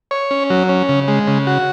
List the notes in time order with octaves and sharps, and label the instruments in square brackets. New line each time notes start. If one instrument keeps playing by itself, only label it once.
[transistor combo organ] C#5
C#4
F#3
C#4
C#3
G#3
C#3
F#4